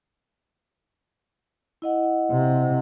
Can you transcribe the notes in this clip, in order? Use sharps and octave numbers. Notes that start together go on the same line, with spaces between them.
E4 D#5 F#5
C3